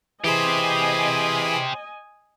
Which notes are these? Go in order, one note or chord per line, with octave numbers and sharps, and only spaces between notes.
E3 G4 G#4 C5 D#5 G#5 B5